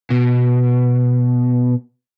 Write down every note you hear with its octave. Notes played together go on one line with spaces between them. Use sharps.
B2